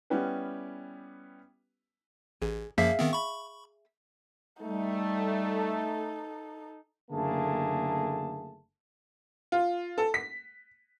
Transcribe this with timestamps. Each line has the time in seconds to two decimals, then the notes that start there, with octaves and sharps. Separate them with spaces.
0.10 G3 B3 C#4 E4 G4 B4
2.42 A1 G#4
2.78 F#2 F3 A#3 G#4 E5 F5
2.99 D#3 B3 C4
3.13 B5 C#6
4.62 G3 A3 D#4 A4
7.11 F#1 D3 A3 A#3 G#4 A5
9.52 F4
9.98 A4
10.14 B6